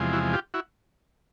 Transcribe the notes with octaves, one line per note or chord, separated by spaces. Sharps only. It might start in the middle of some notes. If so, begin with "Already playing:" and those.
Already playing: E2 C3 F3 G#3
E4 F#4
F4 G4
E4 F#4